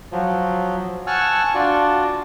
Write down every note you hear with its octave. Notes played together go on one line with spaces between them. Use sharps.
F3 F#3
F#5 G#5 A5 C#6 E6 F6
D4 F4 F#4 D5